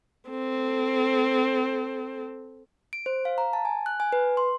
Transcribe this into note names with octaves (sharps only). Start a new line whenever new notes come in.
C4 A4
D7
C5
F5
A#5
A5
G#5
F#6
G#5
B4
C6